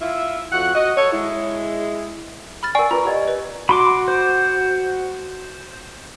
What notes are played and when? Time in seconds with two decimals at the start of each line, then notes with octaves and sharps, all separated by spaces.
0.01 E4 F4 E5
0.52 F2 F#4 F#5
0.75 F#4 D#5
0.97 A4 C#5
1.13 G#3 E4
2.63 B5 F6 A6
2.75 A#4 D5 G#5 C#6 C7
2.91 F4 B4 A#5 C#6
3.05 G4 D5 D#5
3.28 B4
3.69 F#4 B5 C6 D6
4.08 C5